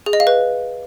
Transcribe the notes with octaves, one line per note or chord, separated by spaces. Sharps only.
G#4
D#5
F5
B4